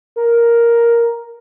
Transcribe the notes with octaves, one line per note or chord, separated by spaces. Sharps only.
A#4